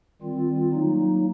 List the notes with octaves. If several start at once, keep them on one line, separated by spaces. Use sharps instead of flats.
D#3 G3 C4 F4
F#3 A#3 D#4